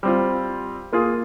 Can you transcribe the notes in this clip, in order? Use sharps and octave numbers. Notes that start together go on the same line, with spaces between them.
G3 C4 F4
A#3 F4 G#4